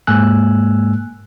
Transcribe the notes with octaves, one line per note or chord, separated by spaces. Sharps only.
G#2 G#3 A#3 G#5 E6 F#6